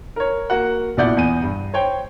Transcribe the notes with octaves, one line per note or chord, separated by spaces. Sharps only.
A#4 C#5
A#3 F#4 F#5
A#1 B2 E4 D5 F#5 G6
E2 G#5 D#7
G2
C5 C#5 G5